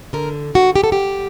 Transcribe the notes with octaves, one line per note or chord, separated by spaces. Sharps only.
D3 A#4
D3 F#4
G4
A4
G3 G4